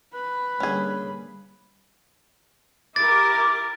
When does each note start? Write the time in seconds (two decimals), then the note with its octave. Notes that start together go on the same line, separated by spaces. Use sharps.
0.14 B4 B5
0.60 D3 G3 A#3 C#4 G#4
2.96 E4 G4 A#4 D6 A6